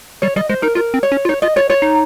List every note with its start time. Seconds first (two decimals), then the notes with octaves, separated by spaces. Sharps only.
0.22 G3 C#5
0.36 G3 D#5
0.49 G#3 C5
0.62 D#4 A#4
0.75 F4 A#4
0.94 C4
1.03 C#5
1.12 C#4
1.25 F4
1.29 D#4 C#5
1.42 F4 D#5
1.56 F4 C#5
1.69 F4 C#5
1.82 D#4